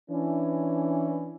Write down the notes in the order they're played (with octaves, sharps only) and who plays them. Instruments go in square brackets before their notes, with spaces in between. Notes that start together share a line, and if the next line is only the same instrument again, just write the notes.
[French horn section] E3 C#4 D4